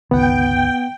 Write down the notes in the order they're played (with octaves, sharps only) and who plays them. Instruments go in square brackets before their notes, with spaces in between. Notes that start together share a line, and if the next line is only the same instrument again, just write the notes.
[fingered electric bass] G1 C#2 D#3 [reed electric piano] B3 F#5 [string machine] G5